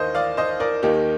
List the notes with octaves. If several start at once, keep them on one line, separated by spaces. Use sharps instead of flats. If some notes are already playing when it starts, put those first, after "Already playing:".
Already playing: D#2 D#3 C5 D#5 F5
D5 F5
C5 D#5
A#4 D5
D#2 D#3 A#3 D#4 G4